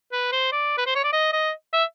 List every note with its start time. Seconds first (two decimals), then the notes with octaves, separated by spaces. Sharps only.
0.12 B4
0.32 C5
0.52 D5
0.78 B4
0.86 C5
0.95 C#5
1.04 D5
1.13 D#5
1.33 D#5
1.73 E5